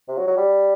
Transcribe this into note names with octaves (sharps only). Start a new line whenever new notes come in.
C3
F#3
F#3
G3